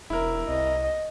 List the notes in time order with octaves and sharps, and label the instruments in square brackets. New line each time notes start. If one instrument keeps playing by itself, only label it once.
[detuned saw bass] E1 [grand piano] E4 A#4
[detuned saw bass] C2 [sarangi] D#5